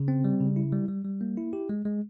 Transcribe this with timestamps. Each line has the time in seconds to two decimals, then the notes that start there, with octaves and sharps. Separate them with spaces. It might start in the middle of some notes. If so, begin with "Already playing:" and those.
Already playing: C#3
0.08 C4
0.24 G3
0.40 C#3
0.56 E4
0.73 G3
0.88 G3
1.05 G3
1.21 A#3
1.37 E4
1.53 G4
1.69 G#3
1.85 G#3